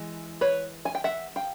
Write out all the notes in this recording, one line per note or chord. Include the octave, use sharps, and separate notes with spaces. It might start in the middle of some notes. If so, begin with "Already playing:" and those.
Already playing: E3 G#3
B4 C#5
G#5
G5
E5 F#5
F5 G5